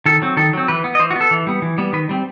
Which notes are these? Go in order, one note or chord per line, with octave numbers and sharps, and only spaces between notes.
D#3 A4
F#3 C4
D#3 A4
F#3 C4
E3 B4
B3
D#5
E3 C5
F#4
B3
A4
E3
G3 B3
E3
G3 B3
D#3 B4
G3 C4